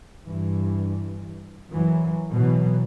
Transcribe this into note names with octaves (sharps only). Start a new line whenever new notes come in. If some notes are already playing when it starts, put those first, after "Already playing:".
G2 E3
F#2 E3 F#3
B2 E3 F#3